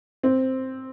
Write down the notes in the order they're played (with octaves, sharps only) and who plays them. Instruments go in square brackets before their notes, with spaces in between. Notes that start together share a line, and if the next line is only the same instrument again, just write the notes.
[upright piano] C4